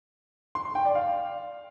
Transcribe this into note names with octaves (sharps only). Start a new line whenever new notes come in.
C6
C6
G5
D5
F5